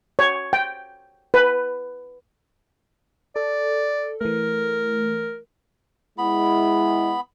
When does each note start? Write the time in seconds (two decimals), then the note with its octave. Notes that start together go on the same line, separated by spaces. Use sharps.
0.19 C#5
0.53 G5
1.34 B4
3.36 A4 D5
4.21 E3 A3 A#4
6.18 G#3 B3 E4 B5